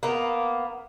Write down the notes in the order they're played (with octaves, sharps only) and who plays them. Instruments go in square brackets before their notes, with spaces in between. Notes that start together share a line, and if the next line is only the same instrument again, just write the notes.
[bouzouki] A#3 B3